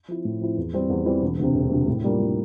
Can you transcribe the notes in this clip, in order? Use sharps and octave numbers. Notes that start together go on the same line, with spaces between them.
F3 C4 E4
A2
F3 C4 E4
E2
E3 G3 C4
E2
E3 G3 C4
E1
D2 C3
E1
D2 C3
A2
G3 A#3 D4 F4
A2